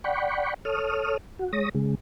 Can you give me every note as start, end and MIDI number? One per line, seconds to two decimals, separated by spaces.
0.04 0.54 74
0.04 0.54 78
0.04 0.54 79
0.04 0.54 83
0.04 0.54 85
0.65 1.17 69
0.65 1.17 73
0.65 1.17 87
0.65 1.17 89
1.39 1.52 66
1.53 1.69 56
1.53 1.69 73
1.53 1.69 87
1.53 1.69 94
1.75 1.95 49
1.75 1.95 56